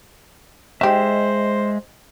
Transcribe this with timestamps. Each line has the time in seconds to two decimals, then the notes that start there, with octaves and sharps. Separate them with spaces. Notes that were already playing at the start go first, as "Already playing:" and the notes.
0.81 G#3 D#4 G4 C5 E5